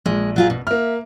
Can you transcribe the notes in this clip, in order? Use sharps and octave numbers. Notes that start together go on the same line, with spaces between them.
A#1 G#3
F#3 F4 G#4
B2
A#3 E5 F6